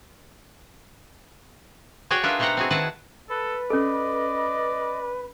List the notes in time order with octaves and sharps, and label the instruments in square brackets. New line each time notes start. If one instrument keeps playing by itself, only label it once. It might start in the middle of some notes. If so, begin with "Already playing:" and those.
[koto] F#4 G#4 C#5 D5 G5
D4 D#4 F4 A#4 B4 E5
B2 A3 G4 C5 F#5 A#5
C4 F#4 G#4
D#3 E4 G#4 B4 F#5 A5
[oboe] A4 [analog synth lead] B4
[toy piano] C#4 A4 [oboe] D5 [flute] D#5